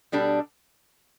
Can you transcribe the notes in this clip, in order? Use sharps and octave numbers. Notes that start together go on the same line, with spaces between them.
B2 G3 D4 A4